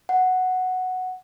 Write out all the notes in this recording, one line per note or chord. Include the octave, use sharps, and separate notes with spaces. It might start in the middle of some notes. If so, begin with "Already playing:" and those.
F#5